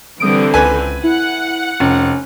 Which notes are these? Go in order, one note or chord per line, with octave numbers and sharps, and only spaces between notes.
D3 E3 G3 C4 D#6 D7
C#2 B4 G#5
E4 F#5
F1 C#4